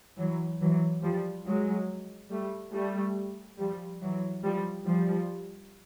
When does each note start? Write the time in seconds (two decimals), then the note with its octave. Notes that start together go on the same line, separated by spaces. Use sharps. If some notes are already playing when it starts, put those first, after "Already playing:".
0.17 E3 F#3
0.61 E3 F#3
1.02 F3 G3
1.46 F#3 G#3
2.30 G3 A3
2.73 G3 A3
3.59 F3 G3
4.01 E3 F#3
4.44 F3 G3
4.85 F3 G3